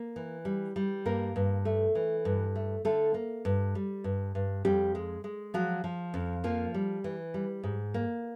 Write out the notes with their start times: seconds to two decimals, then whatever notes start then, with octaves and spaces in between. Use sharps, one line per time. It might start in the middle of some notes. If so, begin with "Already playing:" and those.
Already playing: A#3
0.16 E3
0.45 G3
0.76 G3
1.05 G2 A#3 A#4
1.36 G2
1.65 A3
1.95 E3
2.25 G2
2.55 A3
2.85 D3 A3 A4
3.14 A#3
3.45 G2
3.75 G3
4.04 G2
4.35 G2
4.65 F2 G3 G4
4.95 G#3
5.24 G#3
5.54 F3 F#3 F#4
5.84 F3
6.14 F2
6.44 F3 A#3 F4
6.74 G3
7.04 E3
7.34 G3
7.63 G#2
7.94 A#3